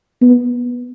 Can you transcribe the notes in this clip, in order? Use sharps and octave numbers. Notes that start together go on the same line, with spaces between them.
B3